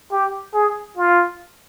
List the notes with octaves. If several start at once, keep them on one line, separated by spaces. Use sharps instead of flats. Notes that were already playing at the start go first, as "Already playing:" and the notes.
G4
G#4
F4